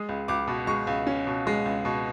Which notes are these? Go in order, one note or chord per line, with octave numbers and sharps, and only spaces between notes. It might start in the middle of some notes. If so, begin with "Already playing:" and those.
Already playing: G#3 D#6
C#2
C#2 D6
B2
G#3 C#6
C#2
C#4
B2
G#3
C#2
B2